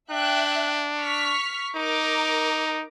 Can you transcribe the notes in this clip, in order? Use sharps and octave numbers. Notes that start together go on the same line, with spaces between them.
D4 E5 G5 F#6
C#6 F6 B6
D#4 A#4 A#5 D6